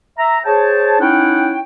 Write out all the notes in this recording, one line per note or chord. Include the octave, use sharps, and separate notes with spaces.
E5 A#5
G#4 C5 C#5 G5 A5
C#4 D#4 E4 C#5 F#5 G5